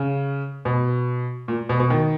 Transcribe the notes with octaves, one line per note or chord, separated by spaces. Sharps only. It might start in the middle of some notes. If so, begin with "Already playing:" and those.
Already playing: C#3
B2
A#2
B2
B2
D#3